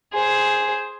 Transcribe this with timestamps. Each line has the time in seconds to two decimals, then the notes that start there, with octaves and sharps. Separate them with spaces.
0.13 G#4 C5